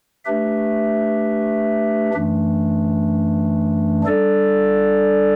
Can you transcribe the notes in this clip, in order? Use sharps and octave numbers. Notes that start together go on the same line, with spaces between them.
A3 D4 G4 B4 E5
F#2 E3 A3 D4
G3 D4 A4 D5